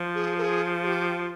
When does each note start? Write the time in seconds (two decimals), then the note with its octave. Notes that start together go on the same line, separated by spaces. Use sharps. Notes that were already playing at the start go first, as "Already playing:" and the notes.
Already playing: F3
0.15 G#4
0.38 A#4
0.42 G#4
0.83 G#4
0.86 G4